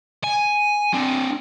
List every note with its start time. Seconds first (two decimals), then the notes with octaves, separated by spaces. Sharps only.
0.24 G#5
0.94 C4 D4